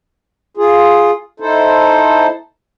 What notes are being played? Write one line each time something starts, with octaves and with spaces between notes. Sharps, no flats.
F4 G#4
D#4 E4 A4 C5